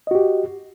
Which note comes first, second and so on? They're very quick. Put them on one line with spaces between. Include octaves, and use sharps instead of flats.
D#5 F#4 G4